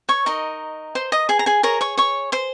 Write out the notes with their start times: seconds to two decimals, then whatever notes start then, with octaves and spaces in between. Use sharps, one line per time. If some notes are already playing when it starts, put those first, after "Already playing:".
0.09 C#5 C#6
0.26 D#4 A#4 D#5
0.95 C5 C6
1.12 D#5 D#6
1.29 G#4 G#5
1.39 A#5
1.46 G#4 G#5
1.63 G#4 A#4 C#5 A#5
1.81 C#5 C#6
1.98 C#5 C#6
2.32 C5 C6